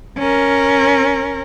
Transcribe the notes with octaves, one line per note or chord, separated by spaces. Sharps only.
C#4 A#4